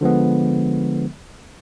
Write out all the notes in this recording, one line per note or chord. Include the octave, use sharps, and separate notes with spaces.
D3 F3 G#3 B3